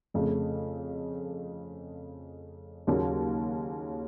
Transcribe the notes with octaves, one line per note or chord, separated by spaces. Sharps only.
F2 C#3 A3
D#2 C#3 F#3 A#3 C#4